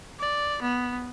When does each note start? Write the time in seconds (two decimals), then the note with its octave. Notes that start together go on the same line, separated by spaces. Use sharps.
0.20 D5
0.62 B3